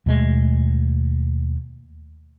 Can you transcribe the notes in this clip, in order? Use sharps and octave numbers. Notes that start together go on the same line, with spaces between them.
D#2 B2 G#3 A3